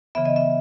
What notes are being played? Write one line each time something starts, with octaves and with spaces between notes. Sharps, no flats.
C#3 E3 B3 E5
D#5
E5